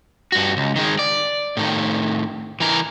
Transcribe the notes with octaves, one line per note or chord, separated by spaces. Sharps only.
G2 F#4
C#2
D#3 G#3
D5
A2 D#3
E3 A#4